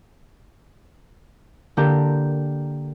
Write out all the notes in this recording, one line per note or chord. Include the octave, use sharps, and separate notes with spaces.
D3 A#3 D4 G4 G5 A#5